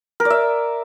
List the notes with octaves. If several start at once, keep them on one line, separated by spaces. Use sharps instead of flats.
A#4
D5
E5